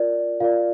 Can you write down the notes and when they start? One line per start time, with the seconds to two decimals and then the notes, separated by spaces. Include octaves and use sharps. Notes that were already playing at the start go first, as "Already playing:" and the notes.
Already playing: F4 A#4 D5
0.40 F4 A#4 D5 F5